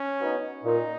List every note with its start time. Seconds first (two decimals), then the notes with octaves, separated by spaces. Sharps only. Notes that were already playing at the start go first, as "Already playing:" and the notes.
Already playing: C#4
0.20 F#3 B3 D#4
0.64 A#2 D#4